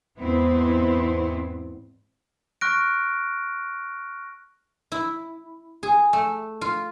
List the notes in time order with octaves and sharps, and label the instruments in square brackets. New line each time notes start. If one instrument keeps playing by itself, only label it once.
[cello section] E2 G#2 B3 C4 E4
[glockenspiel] C#6 F6 F#6 A#6 D7
[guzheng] E4
G#4
A3
F4